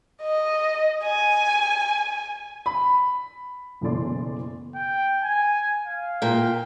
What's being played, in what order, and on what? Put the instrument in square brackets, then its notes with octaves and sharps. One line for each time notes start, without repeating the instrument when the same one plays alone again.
[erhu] D#5
G#5
[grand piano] B5
[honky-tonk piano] F#1 B2 E3 A3 D5 C6
[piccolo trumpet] G5
G#5
F5
[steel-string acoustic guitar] A#2 G5